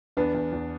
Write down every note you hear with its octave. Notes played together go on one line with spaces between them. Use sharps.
E2 B3 D4
E2
E2